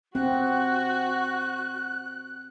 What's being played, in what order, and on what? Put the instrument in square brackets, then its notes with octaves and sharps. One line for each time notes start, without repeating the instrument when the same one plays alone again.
[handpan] C4 [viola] F#4 [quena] F#6